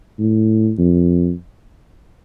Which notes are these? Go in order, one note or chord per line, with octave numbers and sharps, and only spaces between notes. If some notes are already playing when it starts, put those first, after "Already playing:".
A2
F2